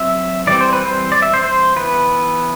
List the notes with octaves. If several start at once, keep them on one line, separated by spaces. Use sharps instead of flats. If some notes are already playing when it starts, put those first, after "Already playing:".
Already playing: F#3 C4 E5
E3 G3 C4 D5
C5
B4
C5
D5
E5
C5
C5
E3 B3 B4